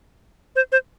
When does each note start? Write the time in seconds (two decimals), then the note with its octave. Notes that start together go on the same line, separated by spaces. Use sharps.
0.56 C5
0.72 C5